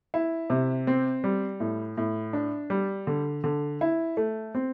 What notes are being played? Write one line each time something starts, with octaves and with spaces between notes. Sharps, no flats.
E4
C3
C4
G3
A2
A2
D4
G3
D3
D3
E4
A3
C4